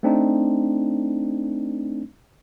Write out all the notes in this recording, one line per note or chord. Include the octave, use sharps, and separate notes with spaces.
A3 C4 D4 D#4